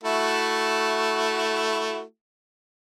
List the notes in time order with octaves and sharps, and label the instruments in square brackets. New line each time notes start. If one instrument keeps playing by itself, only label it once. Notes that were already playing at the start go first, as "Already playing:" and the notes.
[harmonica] A3 E4 F#4